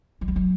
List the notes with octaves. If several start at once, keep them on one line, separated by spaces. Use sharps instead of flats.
F#3
G3
F#3